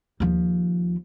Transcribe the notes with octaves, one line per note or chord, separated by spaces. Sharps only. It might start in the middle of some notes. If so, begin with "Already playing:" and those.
D#2 F3